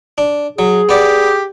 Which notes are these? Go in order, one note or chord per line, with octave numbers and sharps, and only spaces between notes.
D4
F#3 G#4
B3 G4 D5